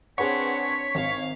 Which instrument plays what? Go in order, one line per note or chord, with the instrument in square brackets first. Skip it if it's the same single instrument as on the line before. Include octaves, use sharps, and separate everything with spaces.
[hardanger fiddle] C4 D4 [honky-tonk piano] G#4 B4 F#5 [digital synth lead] C#5 [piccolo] B6
[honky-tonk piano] G#1 [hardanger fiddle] F5